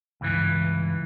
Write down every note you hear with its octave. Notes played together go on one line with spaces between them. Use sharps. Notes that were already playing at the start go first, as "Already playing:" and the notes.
C#2 G2 E3